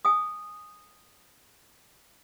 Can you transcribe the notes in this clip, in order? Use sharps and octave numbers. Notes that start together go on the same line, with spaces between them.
G#5 D#6